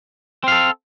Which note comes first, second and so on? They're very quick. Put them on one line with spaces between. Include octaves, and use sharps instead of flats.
C4 F5 A4